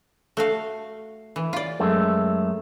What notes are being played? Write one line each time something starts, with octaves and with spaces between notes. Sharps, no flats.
A3 F#4 F5
E3
F4 D5
F#2 G#3 A3